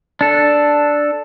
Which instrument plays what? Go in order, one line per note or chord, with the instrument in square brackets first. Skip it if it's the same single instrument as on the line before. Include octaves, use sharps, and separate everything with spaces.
[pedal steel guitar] D4 A4